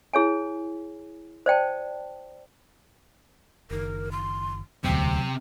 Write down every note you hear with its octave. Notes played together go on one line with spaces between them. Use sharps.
E4 G#4 C#5 G#5
C5 D5 G5 A5
F#1 D#3 A#4
C6
E1 D2 C3 F#3 C4 G5